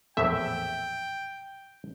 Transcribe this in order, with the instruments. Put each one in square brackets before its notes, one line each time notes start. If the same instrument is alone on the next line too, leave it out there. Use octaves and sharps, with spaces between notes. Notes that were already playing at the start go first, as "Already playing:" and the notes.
[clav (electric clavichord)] A#1 E2 A2 [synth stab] E5 [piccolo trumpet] G5